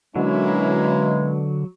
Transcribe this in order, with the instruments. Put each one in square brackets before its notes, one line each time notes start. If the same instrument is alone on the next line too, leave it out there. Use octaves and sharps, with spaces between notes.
[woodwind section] B2 G#3 [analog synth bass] D3 [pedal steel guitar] F#3 [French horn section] A#3 C#4 E4